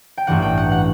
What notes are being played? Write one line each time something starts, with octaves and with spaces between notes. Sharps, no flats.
G5
A1 G2 E3 F#5
G5
F#5
F#5